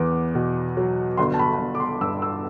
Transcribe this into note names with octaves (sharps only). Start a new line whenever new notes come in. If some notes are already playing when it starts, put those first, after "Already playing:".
Already playing: E2 B3 D6
B2
F#3
G1 C6
A5
B5
G1
D6
C6
G2 E6
E6